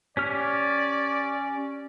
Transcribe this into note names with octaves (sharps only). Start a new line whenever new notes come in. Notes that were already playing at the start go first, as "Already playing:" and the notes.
C#4 G4 D5 F6